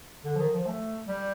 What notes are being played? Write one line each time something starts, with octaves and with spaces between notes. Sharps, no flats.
D3
F3
D#3
F3
A3
G3